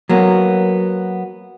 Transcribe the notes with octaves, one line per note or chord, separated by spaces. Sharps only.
F#3 A#3 B3